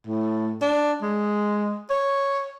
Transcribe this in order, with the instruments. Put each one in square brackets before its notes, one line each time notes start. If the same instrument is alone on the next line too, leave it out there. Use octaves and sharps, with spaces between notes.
[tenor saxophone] A2
D4
G#3
C#5